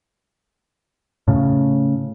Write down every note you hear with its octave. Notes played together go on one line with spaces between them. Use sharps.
A2 C#3